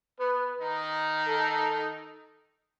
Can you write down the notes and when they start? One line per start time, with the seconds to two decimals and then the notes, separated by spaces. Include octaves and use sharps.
0.19 B3 B4
0.33 B3
0.60 D#3 D#4
1.27 A4